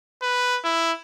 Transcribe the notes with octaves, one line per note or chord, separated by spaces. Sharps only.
B4
E4